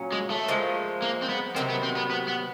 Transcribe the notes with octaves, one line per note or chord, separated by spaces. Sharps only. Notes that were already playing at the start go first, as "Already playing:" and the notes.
Already playing: A#2 F#3 C#4
G#3
A3
A#2 F3 G#3
A#3
C4
B3
C3 D#3 F#3 C4
B3
C4
B3
B3
B3